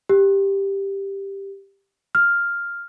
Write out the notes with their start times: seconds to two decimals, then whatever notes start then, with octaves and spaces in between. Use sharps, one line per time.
0.09 G4
2.15 F6